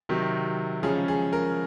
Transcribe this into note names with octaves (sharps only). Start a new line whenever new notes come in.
C3 D#3 F#3
C#3 F3 G#3 C#4 G#4
G#4
A#4